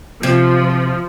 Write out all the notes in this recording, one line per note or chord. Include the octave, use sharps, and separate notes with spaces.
C3 F3